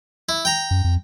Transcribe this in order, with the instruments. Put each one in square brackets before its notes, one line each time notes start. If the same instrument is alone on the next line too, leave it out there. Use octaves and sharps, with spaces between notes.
[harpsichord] E4
G5 A#5
[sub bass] F#2
F2